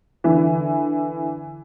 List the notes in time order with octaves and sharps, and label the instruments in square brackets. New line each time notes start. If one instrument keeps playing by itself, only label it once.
[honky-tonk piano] D3 E3